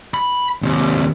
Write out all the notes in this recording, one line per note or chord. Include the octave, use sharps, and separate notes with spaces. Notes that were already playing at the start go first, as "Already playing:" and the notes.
B5
D#2 C3